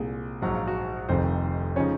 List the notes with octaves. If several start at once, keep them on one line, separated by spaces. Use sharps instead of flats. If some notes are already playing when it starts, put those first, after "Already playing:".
Already playing: C2 A#2 G#3 G#4
A#1 G#2 F#3 F#5
F5
F#4 F#5
F1 F2 C3 D#3 C5
C#3 F3 G#3 C#4 D#4 C#5